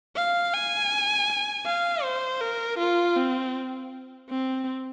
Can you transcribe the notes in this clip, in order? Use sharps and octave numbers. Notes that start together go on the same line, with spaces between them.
F5
G#5
F5
C5
A#4
F4
C4
C4